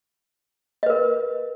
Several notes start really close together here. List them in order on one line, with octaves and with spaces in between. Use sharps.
D#5 B4 A#4